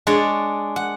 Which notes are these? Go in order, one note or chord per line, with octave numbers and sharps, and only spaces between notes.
G#3 D4 C#5 D5
F#5